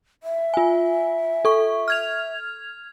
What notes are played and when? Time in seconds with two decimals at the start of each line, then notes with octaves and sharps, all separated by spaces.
0.23 E5
0.54 F4 G#5
1.45 A4 C#6
1.88 F6 G#6 F7